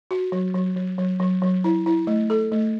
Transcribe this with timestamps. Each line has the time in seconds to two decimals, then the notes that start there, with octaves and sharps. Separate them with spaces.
0.11 F#4
0.32 F#3
0.54 F#3
0.76 F#3
0.98 F#3
1.20 F#3
1.42 F#3
1.64 E4
1.86 E4
2.07 A3
2.30 A4
2.52 A3